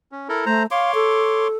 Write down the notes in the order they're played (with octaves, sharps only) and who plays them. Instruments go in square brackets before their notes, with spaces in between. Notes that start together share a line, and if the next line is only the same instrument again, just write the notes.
[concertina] C#4
E4 A4 A#4
[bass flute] A3 [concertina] C5 A#5
[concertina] C#5 C6 D6 [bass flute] F5
[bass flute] A4